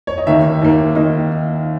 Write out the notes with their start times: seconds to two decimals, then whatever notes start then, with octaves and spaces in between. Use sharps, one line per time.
0.07 C#5
0.18 D#5
0.27 D#2 D#3 A#3 E5
0.62 D#2 D#3 A#3
0.95 D#3 A#3 D#5